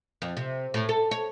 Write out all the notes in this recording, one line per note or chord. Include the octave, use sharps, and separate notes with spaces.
F2
C3
A2
A4
C#5